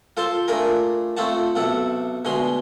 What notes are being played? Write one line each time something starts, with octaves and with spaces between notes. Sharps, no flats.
F4 A4 C5 A5 C6
A3 D4 F4 G#4 A#4
A3 C4 F4 C#5 F#5 A5
B1 C3 A4 F#5
D2 B2 G#3 G#4 C6